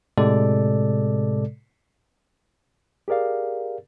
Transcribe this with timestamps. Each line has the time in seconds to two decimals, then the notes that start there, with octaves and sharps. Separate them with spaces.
0.18 A2 C3 G#3 A4 D5
3.08 G4 G#4 A#4 D5 F5